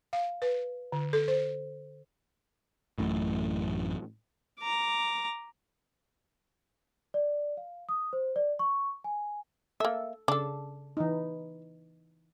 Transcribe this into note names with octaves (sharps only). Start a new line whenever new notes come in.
F5
B4
D3
A4
C5
A1 F#2 A2
A#5 D6
D5
F5
D#6
C5
D5
C#6
G#5
A#3 A4 E5
C#3 D4 A4
E3 D#4